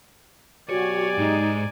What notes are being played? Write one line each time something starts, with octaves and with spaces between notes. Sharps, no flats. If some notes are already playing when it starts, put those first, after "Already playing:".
B2 F#3 F#4 G4 C#5 D5 G#5
G#2 D#4